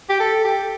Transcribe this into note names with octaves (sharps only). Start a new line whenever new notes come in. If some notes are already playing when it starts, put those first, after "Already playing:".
G4
A4
G4